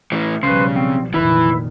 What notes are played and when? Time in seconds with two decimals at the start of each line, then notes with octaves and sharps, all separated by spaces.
0.12 A2 E3
0.43 B1 C#3 F3 G3 B4 C5
0.76 C4
1.14 F1 A#2 D#3 E3 E4 B4